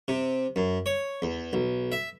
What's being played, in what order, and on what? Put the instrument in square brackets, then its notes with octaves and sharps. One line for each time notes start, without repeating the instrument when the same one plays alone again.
[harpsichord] C3
F#2
C#5
E2
B1
E5